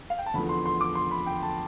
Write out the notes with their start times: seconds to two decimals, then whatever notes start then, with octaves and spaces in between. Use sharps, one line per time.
0.10 F5
0.19 G5
0.26 A5
0.34 E2 D3 F3 B5
0.49 C6
0.66 C6
0.81 D6
0.95 C6
1.11 B5
1.26 G5
1.43 A5